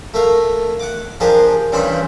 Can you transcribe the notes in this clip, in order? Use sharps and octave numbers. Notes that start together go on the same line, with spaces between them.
A3 A#4 F5
F#5 D6
F3 D4 G4 G#4 A#4
G2 C#3 E3 C5 B5